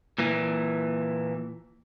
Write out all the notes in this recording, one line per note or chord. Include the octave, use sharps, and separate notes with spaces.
A#2 E3